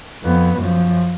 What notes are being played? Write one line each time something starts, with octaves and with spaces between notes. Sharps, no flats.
F2 B3
F#2 F3